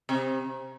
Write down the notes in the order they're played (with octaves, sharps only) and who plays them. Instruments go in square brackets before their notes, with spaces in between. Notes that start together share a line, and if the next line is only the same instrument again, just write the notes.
[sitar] C3